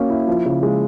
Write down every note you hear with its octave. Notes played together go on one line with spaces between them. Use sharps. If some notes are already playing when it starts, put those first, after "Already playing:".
Already playing: A#3 C#4 F#4
E4
F3
C#3
G#3